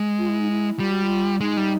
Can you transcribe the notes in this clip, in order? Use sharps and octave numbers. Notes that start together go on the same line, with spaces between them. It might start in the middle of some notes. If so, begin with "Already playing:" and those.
Already playing: G#3
F4
E4
D#4
E4
G3 F4
F#4
F4
G#3 D#4
G3